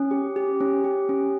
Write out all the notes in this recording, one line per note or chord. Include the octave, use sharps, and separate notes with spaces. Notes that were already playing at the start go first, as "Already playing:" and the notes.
Already playing: C#4
G4
G4
C#4
G4
C#4